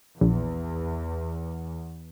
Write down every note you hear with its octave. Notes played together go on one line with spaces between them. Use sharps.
A#1 E2